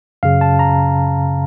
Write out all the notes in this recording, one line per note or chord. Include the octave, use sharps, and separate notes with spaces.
F#2 C#3 F5
A5
A#5